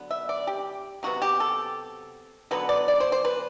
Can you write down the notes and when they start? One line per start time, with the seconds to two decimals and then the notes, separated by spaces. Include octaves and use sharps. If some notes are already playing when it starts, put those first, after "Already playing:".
Already playing: D3 F#3 B3
0.11 E5
0.29 D5
0.47 G4
1.03 C3 F#3 B3 F#4
1.22 G4
1.40 A4
2.51 D3 F#3 B3 B4
2.69 D5
2.88 D5
3.00 C5
3.12 C5
3.25 B4